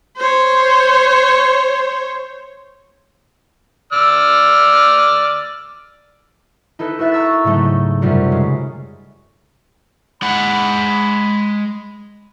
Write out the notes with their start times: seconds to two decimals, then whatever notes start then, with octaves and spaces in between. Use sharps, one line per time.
0.17 C5 C#5
3.93 D5 E6 F6
6.79 D#4 E4 A4 B4
6.99 F#4 B4 E5 F#6 A6
7.12 A#5 C#6 E6 F#6 A6
7.44 G#2 C#3 F#3 A3 D#4
8.02 F#2 C3 G3 F4 F#4
8.32 C#3 G#3
10.23 G#3 F#5 B5